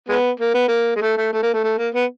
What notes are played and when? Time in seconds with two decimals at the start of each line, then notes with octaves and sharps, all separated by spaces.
0.09 G#3 B3
0.40 A#3
0.54 B3
0.68 A#3
0.96 G#3
1.01 A3
1.17 A3
1.33 A3
1.43 A#3
1.53 A3
1.64 A3
1.78 A#3
1.94 B3